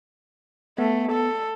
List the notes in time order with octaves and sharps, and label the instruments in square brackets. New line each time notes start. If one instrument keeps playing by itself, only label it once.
[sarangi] A3 [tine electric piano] B3
[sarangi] A4